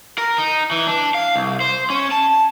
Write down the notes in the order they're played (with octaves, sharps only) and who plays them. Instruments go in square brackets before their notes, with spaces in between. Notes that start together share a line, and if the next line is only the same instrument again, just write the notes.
[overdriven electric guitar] A#4
D#4
E3
D4
F5
C2
C5
C#4
A5